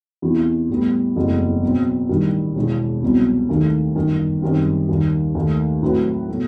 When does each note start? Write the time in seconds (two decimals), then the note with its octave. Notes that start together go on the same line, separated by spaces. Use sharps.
0.22 E2 C3 E3
0.69 A2 G3 B3
1.16 F#1 E2 C3 F#3 A3
1.63 B2 F#3 C4
2.09 A1 G2 D#3 G3
2.55 E1 E2 B2
3.02 C2 B2 F#3 C4
3.49 D#2 D#3 A3
3.96 G1 F#2 D#3
4.42 F#2 D#3 G3 C4
4.89 D#2 D#3 G3
5.35 D#2 D#3 A3
5.83 A2 F#3 C4 F#4 B4
6.28 B2 F#3 A3